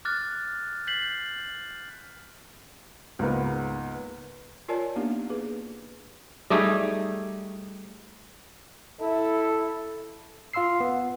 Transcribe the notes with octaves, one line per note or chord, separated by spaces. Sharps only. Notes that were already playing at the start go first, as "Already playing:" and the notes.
D6 F6 F#6 A6
G6 A6 B6 C7 F#7
C#2 G#2 A#3 B3
F4 A#4 C#5 D5 G#5 A5
A#3 B3 D4 D#4 G4
G#4 B4
G3 A3 D#4 G#4
E4 A4
F4 F5 C6 E6 C7
B3